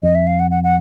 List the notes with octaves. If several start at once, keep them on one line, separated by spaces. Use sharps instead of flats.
F2 D#5
E5
F5
F#5
F#5
F#5